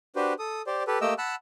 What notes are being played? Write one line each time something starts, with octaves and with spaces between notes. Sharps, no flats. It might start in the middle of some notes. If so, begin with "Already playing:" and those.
D4 F#4 G4 B4 C5
A4 D#6
G4 C5 D5
G4 A4 B4
A3 A#3 G4 D#5 G5 E6
F#5 A5 B5 E6 F#6